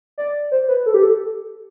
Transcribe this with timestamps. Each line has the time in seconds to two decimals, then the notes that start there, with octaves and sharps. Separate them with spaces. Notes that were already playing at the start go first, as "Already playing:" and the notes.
0.18 D5
0.52 C5
0.68 B4
0.86 A4
0.94 G4
1.03 A4